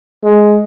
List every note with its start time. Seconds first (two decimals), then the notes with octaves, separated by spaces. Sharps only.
0.23 G#3